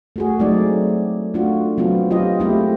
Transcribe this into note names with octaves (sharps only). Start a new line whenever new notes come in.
A3 F#4 G#4
F#3 G#3 A3 C4 D#4 D5
A3 D4 F4 F#4
F#3 B3 C4 F4
F4 G4 D#5
G#3 A3 B3 C4 E4 G4